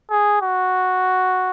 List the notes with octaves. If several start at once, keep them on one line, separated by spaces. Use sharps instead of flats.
G#4
F#4